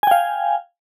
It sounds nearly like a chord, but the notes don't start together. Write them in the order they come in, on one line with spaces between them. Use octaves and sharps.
G#5 G5 F5